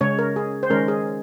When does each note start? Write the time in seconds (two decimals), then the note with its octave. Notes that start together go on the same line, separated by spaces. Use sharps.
0.01 C#3 G#3 C#4 C#5
0.19 A#4
0.36 G#4
0.63 C5
0.70 D#3 G#3 C#4 A#4
0.88 G#4